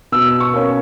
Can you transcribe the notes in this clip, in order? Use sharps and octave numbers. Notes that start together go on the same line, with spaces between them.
B2 E6
C#6
A#3 C#4